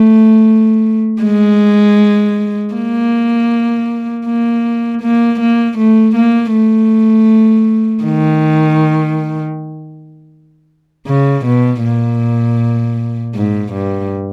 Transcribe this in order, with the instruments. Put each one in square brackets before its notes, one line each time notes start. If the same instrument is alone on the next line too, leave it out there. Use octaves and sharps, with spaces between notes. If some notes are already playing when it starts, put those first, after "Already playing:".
Already playing: [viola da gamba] A3
G#3
A#3
A#3
A#3
A#3
A3
A#3
A3
D#3
C#3
B2
A#2
G#2
G2